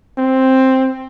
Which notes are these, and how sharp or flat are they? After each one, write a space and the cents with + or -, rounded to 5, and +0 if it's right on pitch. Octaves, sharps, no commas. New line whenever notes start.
C4 +5